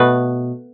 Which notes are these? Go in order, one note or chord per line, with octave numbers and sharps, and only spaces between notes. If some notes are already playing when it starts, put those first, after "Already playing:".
Already playing: B2 A3 B4